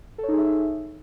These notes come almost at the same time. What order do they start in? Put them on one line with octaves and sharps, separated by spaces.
A4 C#5 D#4 G#4 E5